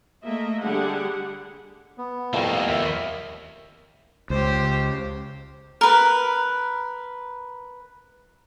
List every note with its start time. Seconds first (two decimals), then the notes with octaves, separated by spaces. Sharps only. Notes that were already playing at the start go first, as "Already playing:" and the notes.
0.24 A3 A#3 D#5 E5
0.63 D3 G3 D4 G4 G#4 F#5
1.98 B3
2.34 C2 F2 A3 A#3 F5
2.68 D#2 A#4 E5
4.30 C#2 G4 C5
5.81 A#4 B4